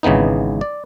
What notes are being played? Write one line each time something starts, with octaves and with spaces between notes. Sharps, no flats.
G#1 C#3 E3 B3 D#4
D5